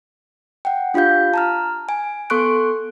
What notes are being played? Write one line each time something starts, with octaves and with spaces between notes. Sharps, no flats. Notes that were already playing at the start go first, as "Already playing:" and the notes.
F#5 G5
D4 F4 G4 F5 G6
A5 A#5 F6
G#5
B3 A4 C6 C#6 F#6 D7